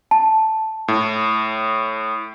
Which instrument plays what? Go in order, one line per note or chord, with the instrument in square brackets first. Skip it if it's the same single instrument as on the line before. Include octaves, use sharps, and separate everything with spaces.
[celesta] A5
[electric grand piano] A2